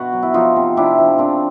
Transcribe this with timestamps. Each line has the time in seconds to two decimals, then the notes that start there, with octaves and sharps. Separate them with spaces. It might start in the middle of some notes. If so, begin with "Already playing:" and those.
Already playing: B2 F#4
0.13 F#3
0.23 E4
0.34 F3 D#4 F4
0.56 C3
0.77 C3 D4 E4
0.98 F3
1.18 C#3 C4 D4